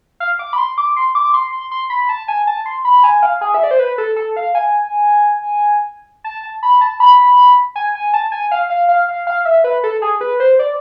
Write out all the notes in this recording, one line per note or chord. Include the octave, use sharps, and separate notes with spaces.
F5
D6
B5
C6
D6
C6
D6
C6
C6
C6
B5
A5
G#5
A5
C6
B5
G#5
F5
G#4
E5
D5
C5
B4
A4
A4
F5
G#5
A5
A5
B5
A5
B5
G#5
G#5
A5
G#5
F5
F5
F5
F5
F5
E5
B4
A4
G#4
B4
C5
D5